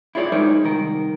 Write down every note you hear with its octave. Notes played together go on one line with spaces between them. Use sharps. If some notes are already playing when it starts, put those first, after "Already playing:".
E4 F4 G#4 C#5 D5
G#3 D#4 A#4 C5 C#5
C2 D#3 A#4